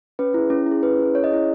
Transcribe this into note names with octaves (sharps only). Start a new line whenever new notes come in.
C#4 B4
E4 G#4
C#4
E4
G#4
C#4 B4
E4 G#4
C#4 C#5
D#5
E4 G#4